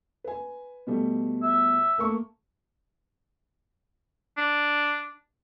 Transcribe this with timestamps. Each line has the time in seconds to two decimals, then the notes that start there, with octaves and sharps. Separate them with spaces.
0.24 B4 G#5
0.87 B2 G3 A3
1.43 E5
1.98 A3 A#3 C#6
4.37 D4